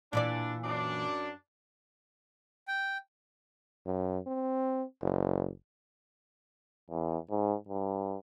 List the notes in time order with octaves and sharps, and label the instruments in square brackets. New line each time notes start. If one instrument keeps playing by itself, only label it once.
[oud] A#2 E3 D5 [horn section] D4
[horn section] F#2 D4
[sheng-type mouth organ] G5
[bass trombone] F#2
C4
F#1
[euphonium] E2
G#2
G2